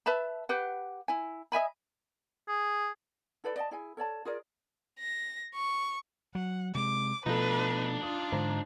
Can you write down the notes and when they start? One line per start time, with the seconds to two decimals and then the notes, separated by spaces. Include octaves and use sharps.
0.06 B4 E5 A5 B5
0.49 G4 B4 F#5
1.08 E4 G#5
1.52 D#5 E5 G#5 B5
2.49 G#4
3.44 E4 A4 B4 D5
3.56 D5 D#5 F#5 A5
3.71 E4 G#4 G#5
3.97 A4 C#5 D5 A5
4.25 F4 G#4 A#4 D5
5.00 A#6
5.55 C#6
6.35 F#3 F#5
6.75 C3 G#3 D6
7.26 B2 F3 A3 D4 D#4 A4 B4
8.03 F4 D#6
8.32 G#2 D3 C5 A#5